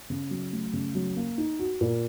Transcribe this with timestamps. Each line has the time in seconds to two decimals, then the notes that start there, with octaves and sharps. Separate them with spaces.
0.10 C#3
0.31 F#3
0.53 A3
0.73 C#3
0.95 F#3
1.16 A#3
1.38 D#4
1.59 F#4
1.81 A#2